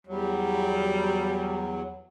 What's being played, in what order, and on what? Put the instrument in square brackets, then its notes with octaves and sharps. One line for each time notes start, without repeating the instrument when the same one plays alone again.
[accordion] E2 F#3 [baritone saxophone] G3